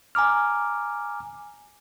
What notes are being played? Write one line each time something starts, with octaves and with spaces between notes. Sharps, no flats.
G#5 A#5 D6 F6